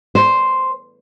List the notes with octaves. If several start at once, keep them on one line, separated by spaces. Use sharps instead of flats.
C5